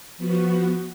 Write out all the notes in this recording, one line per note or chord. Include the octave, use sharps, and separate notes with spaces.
F3 B3 F#4